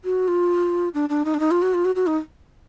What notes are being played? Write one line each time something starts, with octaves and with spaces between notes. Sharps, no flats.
F#4
F4
D4
D4
D#4
D4
D#4
F4
F#4
F4
F#4
F#4
D#4